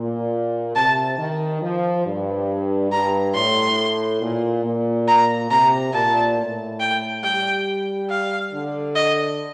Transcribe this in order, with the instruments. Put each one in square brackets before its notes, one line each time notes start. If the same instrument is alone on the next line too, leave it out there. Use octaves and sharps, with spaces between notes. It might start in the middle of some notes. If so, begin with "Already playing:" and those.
Already playing: [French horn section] A#2
[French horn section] C3 [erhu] A5
[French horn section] D#3
F3
G2
[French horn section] G2 [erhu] A#5
[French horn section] A2 [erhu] C6
[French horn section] A#2
A#2
[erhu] A#5
[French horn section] C3 [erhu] A#5
[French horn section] A#2 [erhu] A5
[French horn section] A2
[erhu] G5
[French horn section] G3 [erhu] G5
[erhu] F5
[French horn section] D3
[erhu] D#5